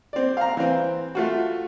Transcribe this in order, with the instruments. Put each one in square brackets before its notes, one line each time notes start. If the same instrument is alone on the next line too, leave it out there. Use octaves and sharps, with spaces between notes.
[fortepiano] C4 D5
F5 A#5
E3 C4
A3 F4 F#4